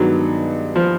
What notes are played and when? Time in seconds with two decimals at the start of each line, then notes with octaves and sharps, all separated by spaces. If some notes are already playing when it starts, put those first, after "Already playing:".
Already playing: G2 D#3 F#3 G#3 B3 D#4
0.75 F3